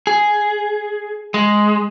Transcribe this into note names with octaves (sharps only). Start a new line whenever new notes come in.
G#4
G#3